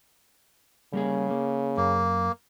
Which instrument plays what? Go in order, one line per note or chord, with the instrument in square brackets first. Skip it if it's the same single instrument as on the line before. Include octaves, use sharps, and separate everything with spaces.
[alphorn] C#3 [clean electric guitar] G3 A#3 G#4
[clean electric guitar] A#3
[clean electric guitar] F#2 [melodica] A#3